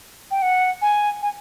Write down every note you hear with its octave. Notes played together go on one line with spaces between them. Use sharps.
G5
F#5
G#5
G#5